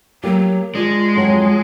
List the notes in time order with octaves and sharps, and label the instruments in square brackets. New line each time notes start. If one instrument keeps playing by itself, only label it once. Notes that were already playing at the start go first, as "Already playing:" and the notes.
[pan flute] F#3 [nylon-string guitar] A#3 G4
[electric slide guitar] G#3 [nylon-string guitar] D4 [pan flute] F4
[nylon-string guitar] F2 F#3